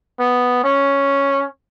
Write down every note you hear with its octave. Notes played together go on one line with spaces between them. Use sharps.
B3
C#4